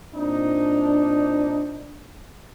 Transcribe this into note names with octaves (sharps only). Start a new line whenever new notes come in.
A#2 C4 D4 D#4